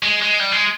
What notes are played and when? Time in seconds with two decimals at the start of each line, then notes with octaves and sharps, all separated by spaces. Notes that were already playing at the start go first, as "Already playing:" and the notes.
0.03 G#3
0.22 G#3
0.40 G3
0.52 G#3